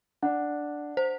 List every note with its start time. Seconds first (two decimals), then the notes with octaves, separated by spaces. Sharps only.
0.23 D4 F#5
0.97 C5